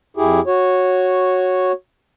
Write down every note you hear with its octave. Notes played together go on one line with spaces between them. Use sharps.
F2 E4 G4 G#4
F#4 C#5